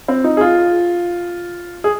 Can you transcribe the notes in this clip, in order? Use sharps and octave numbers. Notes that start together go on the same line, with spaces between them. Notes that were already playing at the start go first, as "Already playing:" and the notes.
C4
D#4
G#4
F4
G#4